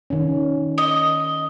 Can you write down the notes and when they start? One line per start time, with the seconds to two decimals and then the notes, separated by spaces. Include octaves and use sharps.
0.10 D#3 C#4
0.78 D#5